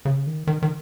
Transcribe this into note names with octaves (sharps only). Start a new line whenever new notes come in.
C#3
D#3
D#3
D#3